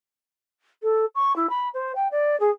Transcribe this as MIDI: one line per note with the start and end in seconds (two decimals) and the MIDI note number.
0.83 1.05 69
1.15 1.35 85
1.36 1.50 64
1.50 1.69 83
1.74 1.92 72
1.95 2.08 79
2.11 2.38 74
2.40 2.50 68